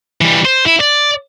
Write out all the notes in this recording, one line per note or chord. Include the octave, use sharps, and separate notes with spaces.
E3 G3
C5
E4
D5